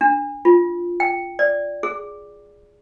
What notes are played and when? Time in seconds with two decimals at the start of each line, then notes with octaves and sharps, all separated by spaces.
0.01 D4
0.45 F4
1.00 G5
1.39 D5
1.83 G#4